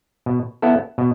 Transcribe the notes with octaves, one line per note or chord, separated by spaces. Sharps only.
B2
B3 E4 A4
B2